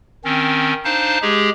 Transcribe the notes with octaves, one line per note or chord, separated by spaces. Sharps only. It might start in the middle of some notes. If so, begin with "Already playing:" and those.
D#3 C4 C#4
D4 D#4 C5 F5 A5
G#3 G4 G#4